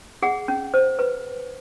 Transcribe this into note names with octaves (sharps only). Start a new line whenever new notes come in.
G#4 F#5
C#4
C5
B4